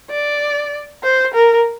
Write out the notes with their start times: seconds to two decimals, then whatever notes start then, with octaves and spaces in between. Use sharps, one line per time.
0.10 D5
1.03 C5
1.34 A#4